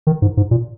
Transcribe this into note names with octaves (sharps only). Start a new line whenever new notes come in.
D#3
G#2
G#2
A#2